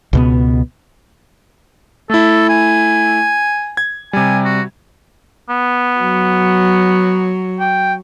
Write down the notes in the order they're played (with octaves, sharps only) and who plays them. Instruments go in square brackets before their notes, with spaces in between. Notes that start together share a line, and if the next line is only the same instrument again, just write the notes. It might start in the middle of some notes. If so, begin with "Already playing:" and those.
[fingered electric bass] C#2 B2 B3
[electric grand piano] A3 E4 [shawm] A4
[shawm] G#5
[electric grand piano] G#6
[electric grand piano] C3 G3 [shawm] G#5
[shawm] F#4
[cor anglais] B3
[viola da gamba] F#3
[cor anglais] G5